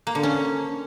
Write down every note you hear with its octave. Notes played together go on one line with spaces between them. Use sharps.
A#3
D3
C#4